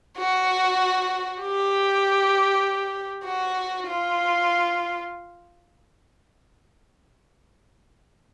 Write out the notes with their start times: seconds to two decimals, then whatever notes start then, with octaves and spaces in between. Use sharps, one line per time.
0.18 F#4
1.41 G4
3.25 F#4
3.87 F4